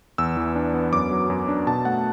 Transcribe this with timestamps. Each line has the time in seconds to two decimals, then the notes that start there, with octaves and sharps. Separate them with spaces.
0.18 E2 E6
0.37 E3
0.56 D4
0.74 B3
0.92 F#2 D6
1.11 F#3
1.30 F#2
1.48 D4
1.67 B2 A5
1.85 A3 F#5